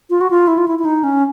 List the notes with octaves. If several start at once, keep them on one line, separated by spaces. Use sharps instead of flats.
F4
F#4
F4
E4
F4
E4
E4
D#4
C#4